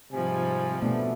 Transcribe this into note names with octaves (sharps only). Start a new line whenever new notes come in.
G#2 C3 F3 G3 G#5
B2 A3 B3 D4